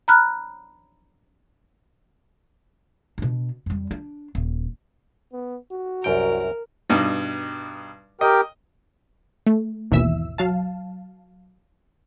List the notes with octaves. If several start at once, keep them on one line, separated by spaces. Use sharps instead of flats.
A#5 B5 F6 F#6
B2 D4
F2 G3
D4
D#1
B3
F#4
C2 F#2 A#4 G5
G2 B2 D#4
G4 A#4 D#5 G5
A3
G#1 D#2 B2 E3 E5 E6
F#3 F5 A5